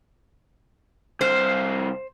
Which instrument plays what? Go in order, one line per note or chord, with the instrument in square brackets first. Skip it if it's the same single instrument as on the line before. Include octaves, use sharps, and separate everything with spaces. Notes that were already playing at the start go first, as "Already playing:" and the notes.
[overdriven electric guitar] C2 F5 [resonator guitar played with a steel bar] C5